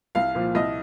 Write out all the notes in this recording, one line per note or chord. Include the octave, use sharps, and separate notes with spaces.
C2 F5
A#2 F3
C2 D#5